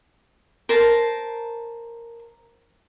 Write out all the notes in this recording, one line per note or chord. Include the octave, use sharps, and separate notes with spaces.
A#4 C5 A5